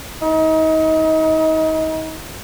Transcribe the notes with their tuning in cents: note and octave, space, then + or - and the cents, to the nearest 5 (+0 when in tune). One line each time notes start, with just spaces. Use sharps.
D#4 +30